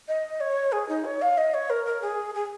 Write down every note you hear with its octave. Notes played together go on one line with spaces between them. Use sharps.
D#5
C#5
G#4
D#4
C#5
F5
D#5
C#5
A#4
A#4
G#4
G#4